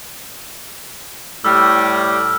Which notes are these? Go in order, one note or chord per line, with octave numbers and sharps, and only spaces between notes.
A2 G3 E6 F6